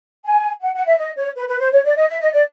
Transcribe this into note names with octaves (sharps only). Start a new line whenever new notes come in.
G#5
F#5
F#5
E5
D#5
C#5
B4
B4
C5
C#5
D5
D#5
E5
D#5
D5